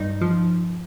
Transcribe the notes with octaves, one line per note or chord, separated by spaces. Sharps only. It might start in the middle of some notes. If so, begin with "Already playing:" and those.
Already playing: G2 D#4
F3